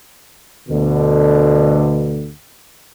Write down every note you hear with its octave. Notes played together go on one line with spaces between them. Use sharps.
D2 B2 D3